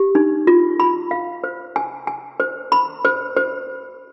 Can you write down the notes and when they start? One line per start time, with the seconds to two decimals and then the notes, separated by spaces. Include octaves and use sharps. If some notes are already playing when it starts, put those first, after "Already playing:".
Already playing: G4
0.15 D#4
0.47 F4
0.80 B5
1.11 F5
1.44 C5
1.76 G#5
2.07 G#5
2.40 C5
2.72 B5
3.05 C5
3.36 C5